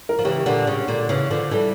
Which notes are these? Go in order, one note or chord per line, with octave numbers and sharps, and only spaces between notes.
A#4
F3
C#3 E3 G4
A#2 D3
C#3
A#2 D3
C#3 E3
D3 F3
E3 G3 A4